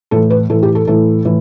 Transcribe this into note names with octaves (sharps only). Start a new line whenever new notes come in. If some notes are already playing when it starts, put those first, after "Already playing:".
A2 E3 A4
B4
A2 E3 A4
G4
A4
A2 E3 A4
A2 E3